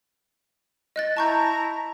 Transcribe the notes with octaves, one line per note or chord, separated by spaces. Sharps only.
D#5 F#6 A6
E4 A5 A#5 C#6 G6